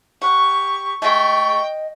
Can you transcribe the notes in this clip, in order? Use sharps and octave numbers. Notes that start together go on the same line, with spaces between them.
G4 F#5 C#6
G#3 A3 D#5 G5 C#6